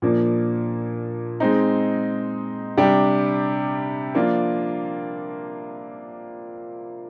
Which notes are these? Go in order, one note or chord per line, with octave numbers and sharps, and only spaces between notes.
A#2 F3 A#3 D4
G#3 C4 D#4
C3 G3 D4 G4
F3 A#3 D4 F4